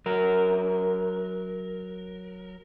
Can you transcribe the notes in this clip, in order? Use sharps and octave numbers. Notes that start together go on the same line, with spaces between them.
F#3 A#4